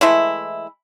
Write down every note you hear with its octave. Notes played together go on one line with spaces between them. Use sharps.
E3 G#3 A3 E4